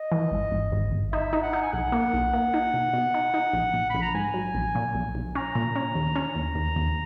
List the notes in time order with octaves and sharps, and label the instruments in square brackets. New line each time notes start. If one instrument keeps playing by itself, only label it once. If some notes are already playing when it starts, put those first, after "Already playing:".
Already playing: [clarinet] D#5
[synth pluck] E3
G#1
G#1
G#1
G#1
[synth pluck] D#4 [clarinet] E5
[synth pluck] D#4
[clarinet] F#5
[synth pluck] D#4
[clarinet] G#5
[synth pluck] B1 [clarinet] F#5
[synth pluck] A#3
B1
A#3
D#4
B2
B2
D#4
D#4
A#1
A#1
[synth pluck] A#1 [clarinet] B5
[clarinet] A#5
[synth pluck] G#2 [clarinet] G#5
[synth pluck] F#3
A#1
A#2
B1
B1
[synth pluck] C#4 [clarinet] A#5
[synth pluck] A#2
C#4
D#2
C#4
D#2
D#2
D#2